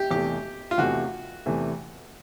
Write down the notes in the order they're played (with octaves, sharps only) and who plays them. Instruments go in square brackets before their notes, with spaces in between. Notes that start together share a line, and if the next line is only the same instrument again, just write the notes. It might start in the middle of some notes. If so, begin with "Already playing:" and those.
Already playing: [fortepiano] G4
[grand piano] E2 C3 E3 A3 [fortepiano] G4
[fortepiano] F4
[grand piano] E2 C3 E3 A3 [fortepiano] F#4
[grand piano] E2 C3 E3 A3